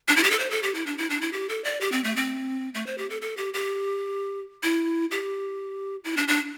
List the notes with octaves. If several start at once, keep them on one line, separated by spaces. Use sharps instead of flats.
D4
E4
G4
A4
C5
A4
G4
E4
D4
E4
D4
E4
G4
A4
D5
G4
C4
A3
C4
A3
C5
G4
A4
A4
G4
G4
E4
G4
E4
D4
D4